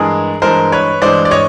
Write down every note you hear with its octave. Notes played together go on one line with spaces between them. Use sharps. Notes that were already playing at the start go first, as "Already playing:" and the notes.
Already playing: G2 E3 G#3 G#4 A#4
G2 E3 G#3 A#4 C5
B4 C#5
G2 E3 G#3 C5 D5
D5
C#5 D#5